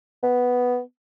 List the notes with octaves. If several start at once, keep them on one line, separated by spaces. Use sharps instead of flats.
B3